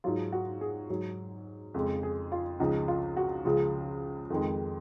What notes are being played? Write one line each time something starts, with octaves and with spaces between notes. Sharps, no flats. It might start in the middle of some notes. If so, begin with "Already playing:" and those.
G#2 F#3 F4
F#4
G#4
G#2 F#3
F2 C#3 G#3
G#4
F4
C#2 C#3 F3 D#4
F4
F#4
C#2 C#3 F3 F4
F2 D#3 G#3